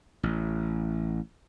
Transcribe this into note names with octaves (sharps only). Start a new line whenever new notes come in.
A1